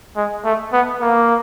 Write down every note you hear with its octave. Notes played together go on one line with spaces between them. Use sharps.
G#3
A3
B3
A#3